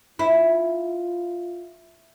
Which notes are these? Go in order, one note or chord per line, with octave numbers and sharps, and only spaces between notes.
E4 F4